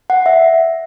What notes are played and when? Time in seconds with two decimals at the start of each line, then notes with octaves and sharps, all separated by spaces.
0.10 F#5
0.26 E5